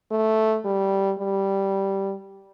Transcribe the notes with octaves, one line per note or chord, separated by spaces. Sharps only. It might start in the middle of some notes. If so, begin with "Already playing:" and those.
A3
G3
G3